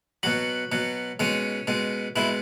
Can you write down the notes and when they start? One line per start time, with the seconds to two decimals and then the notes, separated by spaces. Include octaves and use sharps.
0.23 B2 F#3 F#4
0.72 B2 F#3
1.20 B2 G#3 C#4
1.67 B2 G#3
2.16 B2 G#3 E4